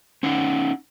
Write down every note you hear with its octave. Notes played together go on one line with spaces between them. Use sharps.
C#4 D#4 F#5